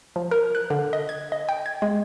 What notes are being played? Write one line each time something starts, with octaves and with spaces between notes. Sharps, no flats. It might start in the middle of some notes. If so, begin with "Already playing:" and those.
F3
A#4
F#6
D3
D#5
G#6
D#5
G5
G#6
G#3